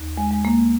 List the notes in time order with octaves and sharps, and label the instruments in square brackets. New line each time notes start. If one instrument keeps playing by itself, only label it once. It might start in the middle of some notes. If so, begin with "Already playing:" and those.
Already playing: [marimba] D#2
G#3
G#3
A#3